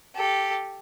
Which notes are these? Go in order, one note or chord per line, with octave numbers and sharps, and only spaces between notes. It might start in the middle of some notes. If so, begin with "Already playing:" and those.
G4 A4